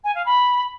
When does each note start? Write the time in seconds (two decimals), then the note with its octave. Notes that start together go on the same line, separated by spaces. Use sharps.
0.04 G#5
0.15 F5
0.26 B5